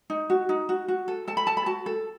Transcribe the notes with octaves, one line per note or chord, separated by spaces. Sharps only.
D#4
F#4
D#4
F#4
F#4
A4
A4 A5
B5
A4 A5
B5
F#4 A5
A4